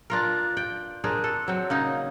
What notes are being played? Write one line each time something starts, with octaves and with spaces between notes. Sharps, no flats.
D4 F4 A#4
G5
C4 D4 G#4 A#4
A4
F#3 C4
C#3 A#3 D#4